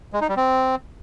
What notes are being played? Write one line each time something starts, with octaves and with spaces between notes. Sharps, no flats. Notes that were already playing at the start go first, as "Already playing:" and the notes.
G#3
D#4
G3
C4